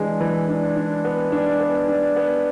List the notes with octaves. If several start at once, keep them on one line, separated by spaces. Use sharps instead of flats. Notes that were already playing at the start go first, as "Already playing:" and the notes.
Already playing: E3 G#3 D4
E3
D4
D4
B3
D4
B3
D4
B3